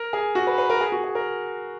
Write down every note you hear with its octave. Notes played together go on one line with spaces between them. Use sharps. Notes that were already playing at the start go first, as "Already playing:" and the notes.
Already playing: A#4
G#4
F#4
B4
B4
A#4
G#4
F#4
G#4
A#4